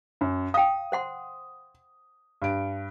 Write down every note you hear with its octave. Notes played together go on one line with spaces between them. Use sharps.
F#2
F5 G5 D#6
C5 F#5 C6
G2 D7